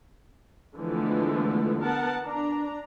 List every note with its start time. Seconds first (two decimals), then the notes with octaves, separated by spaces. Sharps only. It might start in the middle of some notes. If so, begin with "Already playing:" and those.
0.77 D3 E3 F3 G#3 A3 B3
1.81 B3 A#4 F#5 A5
2.25 D4 A#5